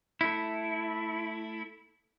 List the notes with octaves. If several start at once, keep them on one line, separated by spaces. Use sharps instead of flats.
A3 E4